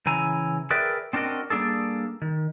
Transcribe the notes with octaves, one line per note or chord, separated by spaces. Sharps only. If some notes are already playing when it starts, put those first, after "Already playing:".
C#3 E3 E4 G#5 A#5
G#4 A#4 B4 D5 E5 G5
C4 D4 F#4 A#4 D#5
G3 A#3 D4 G#4 A4
D#3